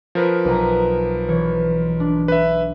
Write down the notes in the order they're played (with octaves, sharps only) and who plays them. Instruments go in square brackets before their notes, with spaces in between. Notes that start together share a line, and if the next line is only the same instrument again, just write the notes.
[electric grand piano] F3 A#4 B4
[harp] B1 G#5 A#5
E3 C#5
D4
[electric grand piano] B4 E5